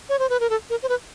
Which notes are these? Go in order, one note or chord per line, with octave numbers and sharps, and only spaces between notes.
C#5
C5
B4
A#4
A4
A#4
C5
B4